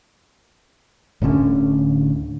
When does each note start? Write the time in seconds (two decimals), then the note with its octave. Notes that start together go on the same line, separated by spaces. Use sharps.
1.22 D1 A2 D3 C#4